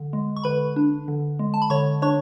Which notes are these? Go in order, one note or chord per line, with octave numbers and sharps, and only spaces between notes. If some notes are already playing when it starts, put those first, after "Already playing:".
Already playing: D3
G#3
C#6
D3 B4 B5
D4
D3
G#3
A5
B5
D3 C#5 C#6
D4 C#5 C#6